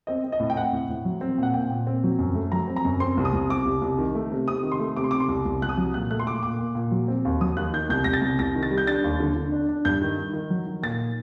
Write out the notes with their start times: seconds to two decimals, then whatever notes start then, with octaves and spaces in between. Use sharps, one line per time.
0.07 C4 D#5
0.24 C4
0.32 D#5
0.40 A2
0.50 G5
0.56 C4 F#5
0.72 A2
0.89 A2
1.05 F#3
1.21 C4
1.38 A#2 F#5
1.54 A#2 G5
1.71 A#2
1.87 C4
2.04 F#3
2.19 F#2
2.35 A3
2.52 F#3 A#5
2.68 C4
2.76 A#5
2.85 F#2
3.00 C4 C6
3.17 C2
3.25 D#6
3.33 C2
3.50 C3 D6
3.65 C2
3.82 C2
3.98 D#3
4.15 A3
4.31 C3
4.48 C3 D#6
4.63 D#3
4.72 C6
4.79 A3
4.96 C3 D6
5.04 C6
5.11 C3 D6
5.20 C6
5.28 C2
5.45 C2
5.62 C2 F#6
5.69 D#6
5.77 F#3
5.94 A#2 F#6
6.11 A3 F#6
6.19 C6
6.26 A#2 D6
6.43 A#2 D6
6.59 A#2
6.75 A#2
6.91 F#3
7.08 C4
7.25 D#2
7.41 F#3 D#6
7.56 D#2 F#6
7.73 D#3 G6
7.89 C2 G6
8.04 C2 A#6
8.13 A6
8.22 C2
8.39 C2 A#6
8.55 D#3
8.63 A6
8.71 G3
8.78 G6
8.87 D4 A6
9.04 D#2
9.20 D3
9.36 D3
9.52 D4
9.69 D4
9.85 G2 G6
10.02 D#3
10.17 D#3
10.33 D#3
10.50 F#3
10.67 D#3
10.83 A#2 A6